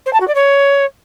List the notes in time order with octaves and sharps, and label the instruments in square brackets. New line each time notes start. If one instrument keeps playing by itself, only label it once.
[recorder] C5
A5
F#4
D5
C#5